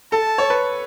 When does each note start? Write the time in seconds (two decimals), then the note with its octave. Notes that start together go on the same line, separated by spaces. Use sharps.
0.12 A4 A5
0.38 C#5
0.50 B4